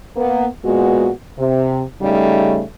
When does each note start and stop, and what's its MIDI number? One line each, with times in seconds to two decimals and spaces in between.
0.16 0.46 58
0.16 0.46 59
0.65 1.10 46
0.65 1.10 56
0.65 1.10 59
0.65 1.10 66
1.39 1.82 48
2.02 2.63 49
2.02 2.63 55
2.02 2.63 57
2.02 2.63 63